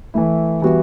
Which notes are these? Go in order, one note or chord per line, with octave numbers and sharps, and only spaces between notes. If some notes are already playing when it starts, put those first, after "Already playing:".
E3 A3 E4
E3 G3 B3 F#4